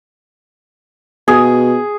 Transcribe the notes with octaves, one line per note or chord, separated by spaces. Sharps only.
B2 G#4